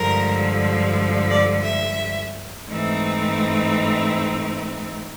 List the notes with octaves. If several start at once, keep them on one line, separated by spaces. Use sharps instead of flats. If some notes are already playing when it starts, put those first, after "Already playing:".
Already playing: G2 D3 F3 G#3 A#4
D5
E5
G#2 E3 A3 C4 D#4